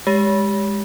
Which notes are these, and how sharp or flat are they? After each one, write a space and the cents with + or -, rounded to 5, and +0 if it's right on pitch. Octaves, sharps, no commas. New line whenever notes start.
G#3 -15 G4 +0